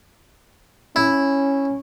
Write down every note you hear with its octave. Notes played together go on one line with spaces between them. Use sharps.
C#4 E4